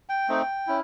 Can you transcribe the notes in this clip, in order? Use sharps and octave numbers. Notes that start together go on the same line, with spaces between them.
G5
A3 C4 D#4
C#4 E4